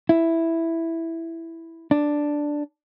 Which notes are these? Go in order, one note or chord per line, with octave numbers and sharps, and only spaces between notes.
E4
D4